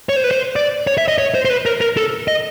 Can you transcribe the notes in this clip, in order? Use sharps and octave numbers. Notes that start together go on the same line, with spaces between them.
C#5
C5
B4
C5
D5
C#5
E5
D#5
C#5
C5
C5
B4
A#4
A#4
A4
D#5